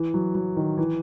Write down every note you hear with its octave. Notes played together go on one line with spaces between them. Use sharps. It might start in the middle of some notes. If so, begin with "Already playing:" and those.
Already playing: E3
F#3
F#3
D#3
E3